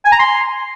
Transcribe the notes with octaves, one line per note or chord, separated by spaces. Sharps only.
G#5
A#5
C6